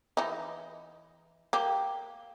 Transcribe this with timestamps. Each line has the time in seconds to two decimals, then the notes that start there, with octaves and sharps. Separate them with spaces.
0.17 E3 D#4
1.53 A#3 G4